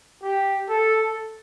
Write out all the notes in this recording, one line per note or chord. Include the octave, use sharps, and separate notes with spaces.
G4
A4